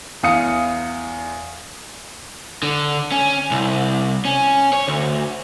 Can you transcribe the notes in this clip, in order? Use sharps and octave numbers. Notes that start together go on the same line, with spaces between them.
E2 F5 D#6 C#7
D3
C#4
C2
C#4
C#5
D2